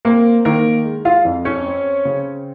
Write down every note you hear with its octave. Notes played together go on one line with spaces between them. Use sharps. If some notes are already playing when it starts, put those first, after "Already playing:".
A#3 C4 A#4
D#3 A#3 A#4
G#3
F4 F5
F2
C#4 C#5
C4
C#3